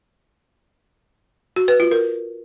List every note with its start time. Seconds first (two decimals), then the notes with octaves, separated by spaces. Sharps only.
1.56 F#4
1.68 B4
1.80 F4
1.91 A#4